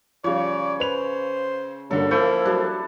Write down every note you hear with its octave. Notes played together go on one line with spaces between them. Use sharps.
C#3 F3 G3 C#5 D5
B4 C5 F7
G2 D3 F#3 A#3 A4
F3 A#3 E4 G6
F#3 G3 D4 A4